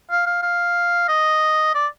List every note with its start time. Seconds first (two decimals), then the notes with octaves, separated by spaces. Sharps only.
0.11 F5
0.26 F5
0.43 F5
1.09 D#5
1.75 D5